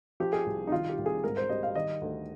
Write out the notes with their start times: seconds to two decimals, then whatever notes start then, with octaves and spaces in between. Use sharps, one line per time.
0.20 F3 G4
0.33 G#4
0.45 C2 G4
0.67 D#4
0.72 D#3 F4
0.89 G4
0.98 C2
1.06 G#4
1.24 G#2 A#4
1.37 C5
1.49 G3 D#5
1.63 F5
1.75 D#3 D#5
2.01 D2